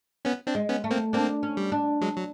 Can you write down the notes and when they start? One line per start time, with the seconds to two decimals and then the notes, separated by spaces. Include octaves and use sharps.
0.25 B3 C#4
0.47 C4 D4
0.55 G#3
0.69 B3 C#4
0.84 A3
0.91 A#3 C4
1.13 A#3 C4 D4
1.43 C#4
1.57 G3
1.72 D4
2.01 F#3 G#3
2.16 F#3